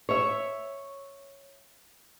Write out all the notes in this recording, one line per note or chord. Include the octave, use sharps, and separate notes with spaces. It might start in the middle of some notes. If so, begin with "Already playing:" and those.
C#5 E5